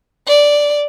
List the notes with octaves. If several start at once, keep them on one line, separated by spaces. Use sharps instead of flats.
D5